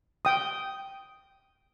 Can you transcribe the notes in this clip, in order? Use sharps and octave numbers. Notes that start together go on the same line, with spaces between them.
G5 D#6